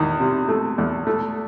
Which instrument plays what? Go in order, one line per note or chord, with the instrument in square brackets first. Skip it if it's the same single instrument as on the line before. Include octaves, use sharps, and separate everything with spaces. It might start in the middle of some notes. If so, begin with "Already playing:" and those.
Already playing: [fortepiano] E2 D#3
C3
A3
E2
A3